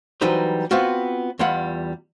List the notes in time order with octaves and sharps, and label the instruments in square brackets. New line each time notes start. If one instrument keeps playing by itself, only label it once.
[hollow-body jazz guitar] E3 F#3 G3 D#4 B4 C5
B3 C4 F4 F#4
E2 G3 E4 F4 F#5 B5